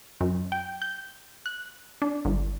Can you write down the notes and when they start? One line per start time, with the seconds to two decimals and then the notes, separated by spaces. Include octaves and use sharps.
0.21 F#2
0.52 G5
0.82 G6
1.46 F#6
2.02 D4
2.25 G1